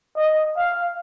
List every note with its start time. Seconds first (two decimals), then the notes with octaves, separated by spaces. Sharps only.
0.16 D#5
0.57 F5